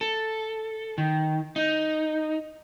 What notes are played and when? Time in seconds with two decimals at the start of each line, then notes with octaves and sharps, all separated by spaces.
0.01 A4
0.98 D#3
1.56 D#4